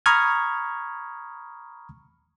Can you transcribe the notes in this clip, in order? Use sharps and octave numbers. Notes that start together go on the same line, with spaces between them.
A#5 B5 C#6 D#6 F6 G#6